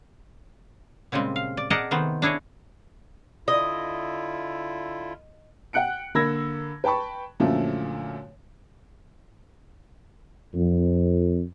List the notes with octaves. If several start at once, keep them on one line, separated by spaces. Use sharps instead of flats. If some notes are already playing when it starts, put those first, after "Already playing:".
A#2 C#3 G3 G#3 C4
F5
D5
G#4 A#4 D5 D#5 F#5 A5
C3 D#3 A3 B3 C5
D4 E4 G#4 C#5 D#5
D3 E4 F4 D#5
F#5 G5 F#6 C#7 D7
D3 A#3 B5 E6 G#6 A#6
B4 G5 A5 B5 C#6
F#2 A#2 D3 F3 F#3 A3
F2